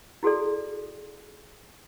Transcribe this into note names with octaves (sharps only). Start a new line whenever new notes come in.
E4 F#4 G#4 A4 D5